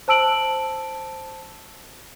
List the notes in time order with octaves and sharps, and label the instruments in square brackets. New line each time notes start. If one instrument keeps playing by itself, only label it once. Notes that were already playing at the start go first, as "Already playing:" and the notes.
[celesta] C5 A5 E6 D7 F#7